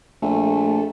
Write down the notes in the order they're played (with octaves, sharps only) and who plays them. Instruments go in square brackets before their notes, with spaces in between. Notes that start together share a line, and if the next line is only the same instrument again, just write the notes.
[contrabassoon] A#1 [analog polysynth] A3